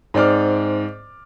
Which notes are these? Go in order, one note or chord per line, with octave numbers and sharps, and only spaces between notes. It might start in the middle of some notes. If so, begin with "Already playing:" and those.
G#2 C4 D5 D6 F6